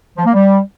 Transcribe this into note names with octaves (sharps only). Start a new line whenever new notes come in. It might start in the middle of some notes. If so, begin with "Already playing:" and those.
F3
A#3
G3